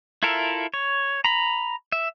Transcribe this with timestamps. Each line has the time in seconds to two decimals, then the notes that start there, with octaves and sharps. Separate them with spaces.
0.23 E4 F4 A4 A#4 E5
0.74 C#5
1.24 A#5 B5
1.92 E5